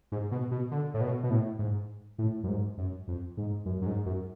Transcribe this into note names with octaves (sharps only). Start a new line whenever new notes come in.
G#2
B2
B2
D3
A2
B2
B2
A2
G#2
A2
F#2
G#2
F#2
F2
G#2
F#2
F#2
G#2
F#2